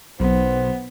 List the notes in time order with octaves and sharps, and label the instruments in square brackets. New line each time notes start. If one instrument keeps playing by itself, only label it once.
[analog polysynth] B1 [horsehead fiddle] B3 [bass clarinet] C5